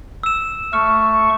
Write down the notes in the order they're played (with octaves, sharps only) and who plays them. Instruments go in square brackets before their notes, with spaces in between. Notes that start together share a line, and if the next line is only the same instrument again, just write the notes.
[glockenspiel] E6 E7
[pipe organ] A3 C#6 [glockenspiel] F6